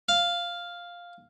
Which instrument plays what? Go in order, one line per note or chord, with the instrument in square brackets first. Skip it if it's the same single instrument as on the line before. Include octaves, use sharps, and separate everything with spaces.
[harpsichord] F5